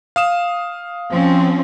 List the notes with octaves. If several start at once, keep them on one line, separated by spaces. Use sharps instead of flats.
F5 D#6 E7
F3 C4 C#4